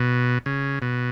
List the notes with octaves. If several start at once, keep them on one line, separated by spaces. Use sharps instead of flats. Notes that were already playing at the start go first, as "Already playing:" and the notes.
Already playing: B2
C#3
B2